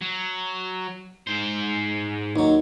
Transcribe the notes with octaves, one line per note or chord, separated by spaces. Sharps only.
F#3
G#2 C5
D#2 F#3 D#4